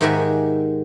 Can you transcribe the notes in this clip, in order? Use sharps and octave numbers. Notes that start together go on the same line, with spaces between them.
G#2 D#3 F#4 G4 E5 G#5